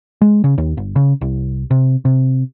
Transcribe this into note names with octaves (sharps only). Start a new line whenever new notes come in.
G#3
C#3
D#2
G1
C#3
C2
C3
C3